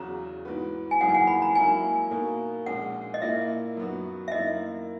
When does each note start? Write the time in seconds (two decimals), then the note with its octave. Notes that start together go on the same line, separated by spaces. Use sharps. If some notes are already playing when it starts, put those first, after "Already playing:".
Already playing: E2 C#3 F#3 C#4 F#4 A#5
0.45 G#2 E3 B3 F#4 B4
0.91 G#5
1.01 G#1 F#2 C#3 E3 A#3 F#5
1.09 G#5
1.14 F#5
1.27 B5
1.42 A#5
1.55 G#2 F#3 A#3 E4 A#4 G#5
2.11 B2 A#3 D#4 A#4
2.66 A#1 A#2 G#3 C#4 F#5
3.14 D#5
3.22 A#2 A#3 E4 E5
3.77 F#2 D#3 F#3 B3 F#4
4.28 E5
4.32 F#2 D#3 A#3 E4 D#5